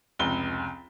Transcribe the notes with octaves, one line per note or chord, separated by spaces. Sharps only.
F1 C#2 G7